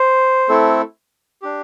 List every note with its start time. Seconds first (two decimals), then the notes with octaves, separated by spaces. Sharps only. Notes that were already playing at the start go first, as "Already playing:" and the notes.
Already playing: C5
0.49 A3 C4 E4 A4
1.42 D4 G4